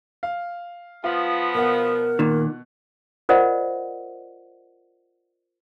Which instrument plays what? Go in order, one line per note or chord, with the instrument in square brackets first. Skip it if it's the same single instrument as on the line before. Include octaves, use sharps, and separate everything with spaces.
[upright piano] F5
[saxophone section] F3 B3 [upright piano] F4
[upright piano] B2 F#5 [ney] A#4
[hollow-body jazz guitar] A#2 D#3
[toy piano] F4 A#4 C5 D5 D#5 F#5